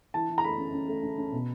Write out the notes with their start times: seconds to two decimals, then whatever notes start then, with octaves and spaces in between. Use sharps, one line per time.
0.14 E3 A5
0.30 E3
0.38 A#5
0.44 A3 B5
0.58 C#4
0.73 C#4
0.88 A3
1.03 C#4
1.18 C#4
1.33 B2